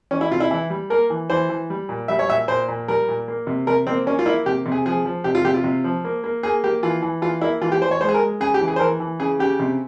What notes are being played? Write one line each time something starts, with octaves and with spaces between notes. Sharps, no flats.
E3 C#4
E4
C3 F4
E4
E3 E4
G3
A#3 A#4
E3
E3 C5
E3
G3
A#2
G3 E5
C#5
A#2 E5
A#2 C5
A#2
G3 A#4
A#2
A#3
C3
C3 A#4
A#3 C4
A#3 C#4
F4
A#3 E4
C3 G4
C3
G#4
F3 G#4
F3
C3 G4
F4
C3 G4
F4
C3
F3
A#3
A#3
A#3 G#4
A#3 G4
E3 F4
E3
E3 F4
A#3 E4
E3 F4
G4
E3 C5
C#5
G#3 C5
G#4
A#4
G#3
C#3 G#4
G4
E3
G#4
C5
E3 A#4
E3
C#3 G#4
C#3 G4
C3